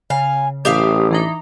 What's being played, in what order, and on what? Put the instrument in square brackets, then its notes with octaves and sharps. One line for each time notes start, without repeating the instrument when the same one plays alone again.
[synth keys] C#3 [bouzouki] F5 [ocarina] G#5
[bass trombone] A1 [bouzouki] G4 E5 F5 [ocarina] D#6
[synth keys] E3 D4 D#4 [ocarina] A#5